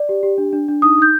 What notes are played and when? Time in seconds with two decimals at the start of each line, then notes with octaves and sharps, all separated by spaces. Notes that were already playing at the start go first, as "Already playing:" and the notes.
Already playing: D5
0.09 G4
0.23 G4
0.38 D4
0.53 D4
0.69 D4
0.82 D#4 D#6
0.98 D#4 G6